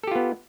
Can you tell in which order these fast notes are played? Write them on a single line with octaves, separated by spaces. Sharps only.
A4 G4 F4 B3